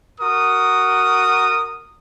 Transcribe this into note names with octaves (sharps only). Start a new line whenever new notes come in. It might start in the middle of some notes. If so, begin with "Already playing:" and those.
F#4 A#4 D#6